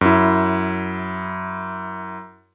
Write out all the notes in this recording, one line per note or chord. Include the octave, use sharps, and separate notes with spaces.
F#2 E4